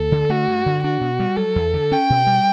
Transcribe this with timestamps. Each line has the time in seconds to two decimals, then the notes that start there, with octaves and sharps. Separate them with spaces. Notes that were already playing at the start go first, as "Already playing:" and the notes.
Already playing: D2 A4
0.12 D3
0.29 A3 F#4
0.48 G2
0.66 D3
0.84 D4 F#4
1.01 B2
1.20 G3
1.37 F#3 A4
1.56 E2
1.74 D3
1.92 C#4 G5
2.10 B2
2.27 G3